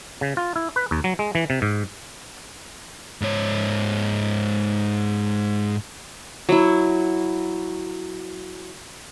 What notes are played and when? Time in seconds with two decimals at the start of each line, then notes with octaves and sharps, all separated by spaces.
0.21 C#3
0.37 F4
0.56 E4
0.76 B4
0.91 D#2
1.04 F#3
1.19 G#3
1.35 E3
1.50 C3
1.62 G#2
3.21 G#2 C#5
6.49 F#3 E4